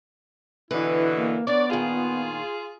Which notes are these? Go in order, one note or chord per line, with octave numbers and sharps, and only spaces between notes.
B2 D3 E3 E4 B4
A#3
B3 D4 C#5 D5
A#2 D#3 F4 G#4